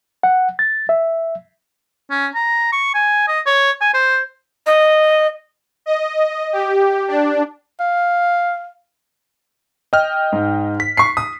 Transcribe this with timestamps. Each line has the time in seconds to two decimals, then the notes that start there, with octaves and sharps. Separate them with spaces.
0.23 F#5
0.59 A6
0.89 E5
2.10 C#4
2.35 A#5
2.73 C#6
2.95 G#5
3.28 D#5
3.46 C#5
3.81 G#5
3.94 C5
4.67 D#5
5.86 D#5
6.53 G4
7.08 D4
7.80 F5
9.93 D#5 G5 F6
10.33 G#2
10.80 B6
10.97 C#6 C7
11.17 D#6